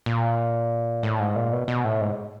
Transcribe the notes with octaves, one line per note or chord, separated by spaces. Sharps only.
A#2
A2
G#2
A#2
B2
B2
A2
G#2